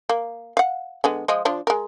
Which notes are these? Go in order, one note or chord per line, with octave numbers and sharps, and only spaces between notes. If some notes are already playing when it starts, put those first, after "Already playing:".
A#3
F5 F#5
D3 G#3 B3
F3 G#3 D#5
F3 D4 F4
G#3 A#4